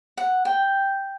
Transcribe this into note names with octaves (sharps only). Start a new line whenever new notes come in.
F#5
G5